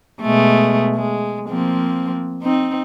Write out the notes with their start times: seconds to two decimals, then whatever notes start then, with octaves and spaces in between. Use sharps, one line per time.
0.21 B2 G#3 A3
0.96 G#3
1.50 F3 A#3 C4
2.43 C4 D#4